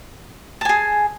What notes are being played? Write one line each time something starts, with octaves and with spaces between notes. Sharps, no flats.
G#4 G#5 A5